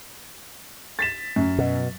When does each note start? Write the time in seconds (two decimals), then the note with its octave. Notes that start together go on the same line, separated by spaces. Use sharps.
0.99 A6 B6 E7
1.36 F#2
1.58 B2